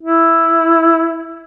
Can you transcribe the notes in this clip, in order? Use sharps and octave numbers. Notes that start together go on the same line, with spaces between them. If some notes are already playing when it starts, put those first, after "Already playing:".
E4